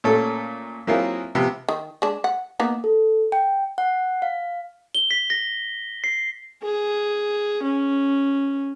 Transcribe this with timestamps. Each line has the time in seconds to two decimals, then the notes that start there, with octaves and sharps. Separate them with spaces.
0.04 A#2 A3 C#4 A4
0.87 F#3 A#3 C4 E4 F4 G#4
1.35 C3 F3 B3
1.69 D#3
2.02 G#3 D4
2.24 F#5
2.60 A#3 B3 D#4
2.84 A4
3.32 G5
3.78 F#5
4.22 F5
4.95 G7
5.11 B6
5.30 A#6
6.04 C7
6.63 G#4
7.63 C#4